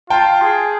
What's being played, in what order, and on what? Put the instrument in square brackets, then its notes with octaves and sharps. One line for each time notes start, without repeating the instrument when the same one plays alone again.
[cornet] F4 [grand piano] G5 A5
[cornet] G#4